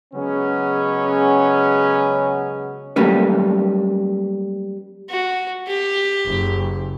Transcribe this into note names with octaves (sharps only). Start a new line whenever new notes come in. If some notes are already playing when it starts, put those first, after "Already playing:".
C#3 F#3 G#3 B3 C#4
F#3 G3 A3 A#3 C#4 B4
F#4
G4
F#1